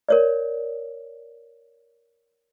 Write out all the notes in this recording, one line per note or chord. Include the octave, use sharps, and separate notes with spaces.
A#4 C#5 D5